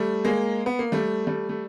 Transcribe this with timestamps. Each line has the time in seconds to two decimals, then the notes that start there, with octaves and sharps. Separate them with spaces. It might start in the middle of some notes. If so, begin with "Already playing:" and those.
Already playing: G3 A3
0.25 G#3 A#3
0.66 B3
0.79 A#3
0.92 G3 A3
1.27 G3 A3
1.49 A3